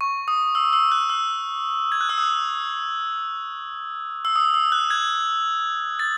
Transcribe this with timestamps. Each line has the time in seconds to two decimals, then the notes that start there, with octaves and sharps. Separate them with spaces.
0.01 C#6
0.28 D#6
0.55 E6
0.73 E6
0.92 F#6
1.10 E6
1.92 G#6
2.01 F#6
2.09 E6
2.18 D#6
4.25 E6
4.36 D#6
4.54 E6
4.72 F#6
4.90 G#6
5.99 A6